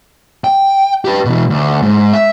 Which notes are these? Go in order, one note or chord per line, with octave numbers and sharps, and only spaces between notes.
G5
G4 B4
B2 E3
D2
G#2
E5